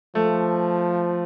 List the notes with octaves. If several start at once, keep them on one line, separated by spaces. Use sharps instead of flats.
F3 A3